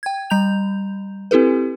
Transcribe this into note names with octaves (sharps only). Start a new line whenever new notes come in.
G5 G#6
G3 A#5 G6 F7
C4 E4 G4 A4 B4